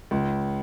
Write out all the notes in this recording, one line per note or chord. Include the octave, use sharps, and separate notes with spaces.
C#2